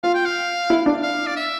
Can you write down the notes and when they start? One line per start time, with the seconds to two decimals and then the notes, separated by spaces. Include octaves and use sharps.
0.03 F4 F5
0.15 G5
0.26 F5
0.70 E4
0.86 D4
1.03 F5
1.27 D5
1.36 E5